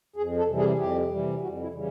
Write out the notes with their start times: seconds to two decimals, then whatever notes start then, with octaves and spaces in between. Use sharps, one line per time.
0.16 F2 G#4
0.37 A4
0.48 C3 E3 G3
0.58 G#4
0.78 F2 G4
1.10 C3 E3 G3
1.41 F2 F#4
1.62 E4
1.72 C#3 E3 G3